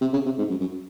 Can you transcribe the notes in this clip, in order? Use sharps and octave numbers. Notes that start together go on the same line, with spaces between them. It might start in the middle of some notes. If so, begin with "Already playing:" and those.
C3
C#3
C3
G#2
F#2
F#2